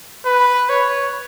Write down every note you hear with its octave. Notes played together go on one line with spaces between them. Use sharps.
B4
C#5